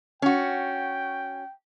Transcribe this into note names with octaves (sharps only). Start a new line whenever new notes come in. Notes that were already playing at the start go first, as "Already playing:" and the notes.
C#4 F#4 G5